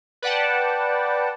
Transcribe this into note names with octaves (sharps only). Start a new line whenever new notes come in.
B4 D5 F#5 G5 A5